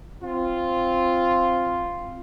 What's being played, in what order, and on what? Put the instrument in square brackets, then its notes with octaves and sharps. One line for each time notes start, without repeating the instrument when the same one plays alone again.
[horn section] C4 F4